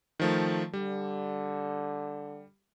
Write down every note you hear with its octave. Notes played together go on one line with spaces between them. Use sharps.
D#3 F3 A3
D3 G3